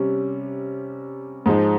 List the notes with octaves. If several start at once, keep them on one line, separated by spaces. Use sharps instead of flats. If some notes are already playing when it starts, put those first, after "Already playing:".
Already playing: C3 G3 C#4
G#2 F3 G#3 D#4